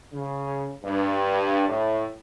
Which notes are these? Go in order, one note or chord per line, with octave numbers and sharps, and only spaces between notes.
C#3
G2
A2